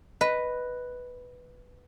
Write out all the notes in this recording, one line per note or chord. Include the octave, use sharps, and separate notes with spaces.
B4 D#5